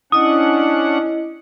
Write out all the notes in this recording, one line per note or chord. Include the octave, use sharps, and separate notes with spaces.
C#4 D4 E4 D#5 F#5 D#6